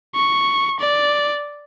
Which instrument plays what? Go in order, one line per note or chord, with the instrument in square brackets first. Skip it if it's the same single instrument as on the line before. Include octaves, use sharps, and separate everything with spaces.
[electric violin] C#6
D5